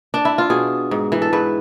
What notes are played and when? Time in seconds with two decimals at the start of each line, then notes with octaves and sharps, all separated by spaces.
0.14 D4
0.25 E4
0.38 F4
0.50 B2 G#4
0.91 G#2
1.12 E3
1.22 A4
1.33 G#2 B4